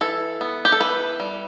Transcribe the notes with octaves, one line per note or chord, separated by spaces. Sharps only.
E3 A4
B3
G4
A4
E3 B4
G3